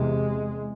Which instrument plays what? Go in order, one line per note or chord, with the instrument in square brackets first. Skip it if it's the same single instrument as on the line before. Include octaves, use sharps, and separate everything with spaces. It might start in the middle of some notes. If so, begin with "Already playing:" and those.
Already playing: [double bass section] E2 C3 G#3